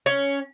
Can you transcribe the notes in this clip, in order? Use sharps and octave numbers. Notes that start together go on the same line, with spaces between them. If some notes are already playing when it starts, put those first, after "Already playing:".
C#4